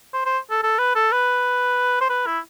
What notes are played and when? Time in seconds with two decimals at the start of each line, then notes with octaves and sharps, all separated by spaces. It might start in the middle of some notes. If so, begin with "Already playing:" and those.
0.13 C5
0.25 C5
0.50 A4
0.63 A4
0.79 B4
0.95 A4
1.12 B4
2.01 C5
2.10 B4
2.26 E4